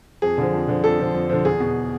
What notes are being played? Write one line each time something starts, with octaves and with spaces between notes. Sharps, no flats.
F2 G#4
D3 F3
F2
D3 F3
F2 A4
D3 F3
F2
D3 F3
E2 G#4
B2